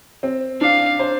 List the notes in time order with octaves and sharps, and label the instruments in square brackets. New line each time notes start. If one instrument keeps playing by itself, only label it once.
[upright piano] C4
[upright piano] D4 [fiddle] F5
[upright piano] C5